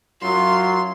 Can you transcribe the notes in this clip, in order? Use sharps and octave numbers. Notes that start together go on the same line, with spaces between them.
F#2 F#3 F4 C6